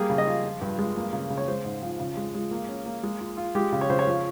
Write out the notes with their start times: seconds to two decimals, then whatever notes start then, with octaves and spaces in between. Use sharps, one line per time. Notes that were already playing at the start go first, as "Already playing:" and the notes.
Already playing: G3 A#3 G#4
0.10 C#3
0.18 D#5
0.27 F4
0.44 F3
0.61 G2
0.79 G#3
0.96 A#3
1.13 C#3
1.30 C#3
1.38 C#5
1.48 G#3 C5
1.65 G#2
1.82 F3
1.99 C#3
2.17 G#3
2.35 G#3
2.51 A#3
2.69 C#4
2.86 A#3
3.03 G#3
3.21 F4
3.37 F4
3.55 G#3 G4
3.72 C#3
3.81 C#5
3.90 C#3 C5
3.99 C#5
4.07 F3